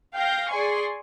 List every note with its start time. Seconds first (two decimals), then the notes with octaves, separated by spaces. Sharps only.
0.14 F5 G5 G6 A#6
0.50 G#4 D5 G#5 C6 C#6